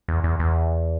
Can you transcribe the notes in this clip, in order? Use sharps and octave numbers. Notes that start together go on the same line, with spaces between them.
E2
E2
E2